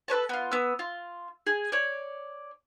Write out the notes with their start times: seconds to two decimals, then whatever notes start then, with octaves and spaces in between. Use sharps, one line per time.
0.08 A4 B4 C#5 A5
0.29 B3 F4
0.52 B3 E6
0.79 F4
1.47 G#4
1.72 C#5 D5